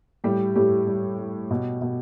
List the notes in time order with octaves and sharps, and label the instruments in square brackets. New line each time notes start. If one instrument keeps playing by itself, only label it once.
[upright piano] A2 G3 G4
A2 G3 G4
G3
G3
B2
B2